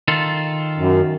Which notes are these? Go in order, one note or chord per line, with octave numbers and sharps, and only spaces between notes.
D#3 F4 A4
F#2